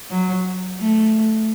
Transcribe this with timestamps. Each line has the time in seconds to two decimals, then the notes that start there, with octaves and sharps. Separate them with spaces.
0.11 F#3
0.79 A3